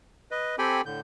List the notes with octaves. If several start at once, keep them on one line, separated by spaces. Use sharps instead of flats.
B4 D#5
C4 G4 A4 G5 G#5 B5
A2 D3 G6